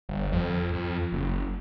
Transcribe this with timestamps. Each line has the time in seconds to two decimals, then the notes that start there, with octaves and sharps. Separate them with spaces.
0.09 G1
0.32 F2
0.73 F2
1.12 F#1